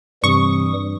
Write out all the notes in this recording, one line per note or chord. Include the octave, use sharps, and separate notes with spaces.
G2 C3 E3 G3 C#6 D#6